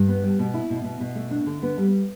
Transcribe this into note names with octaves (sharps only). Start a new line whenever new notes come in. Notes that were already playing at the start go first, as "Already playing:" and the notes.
Already playing: G2
B3
G3
B2
E4
B2
B2
B2
A3
D4
D3
B3
G3